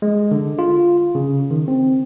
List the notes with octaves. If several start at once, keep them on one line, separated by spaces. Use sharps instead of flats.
G#3
D3
F4
C#3
D#3
C4